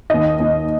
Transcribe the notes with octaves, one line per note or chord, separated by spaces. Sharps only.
D#2 D#3 D#5
D#2 D#3